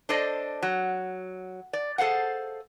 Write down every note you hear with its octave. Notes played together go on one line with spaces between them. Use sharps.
D4 A4 C5 D5 D#5
F#3
D5
G#4 A4 C5 F5 F#5